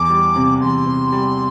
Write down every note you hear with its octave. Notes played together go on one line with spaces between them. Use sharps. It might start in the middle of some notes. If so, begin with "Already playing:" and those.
Already playing: E2 D6
G3
C3
E2 C6
C3
G3